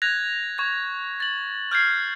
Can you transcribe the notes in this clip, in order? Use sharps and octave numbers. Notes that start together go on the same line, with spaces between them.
F#6 G#6 A#6 F7
C#6 G#6
A6 F#7
F6 G6 G#6 C7